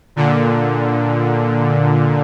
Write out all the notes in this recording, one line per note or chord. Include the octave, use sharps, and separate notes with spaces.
A#2 D3